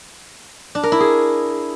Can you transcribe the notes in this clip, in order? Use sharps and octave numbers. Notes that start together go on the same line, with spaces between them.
D4
A#4
E4
G#4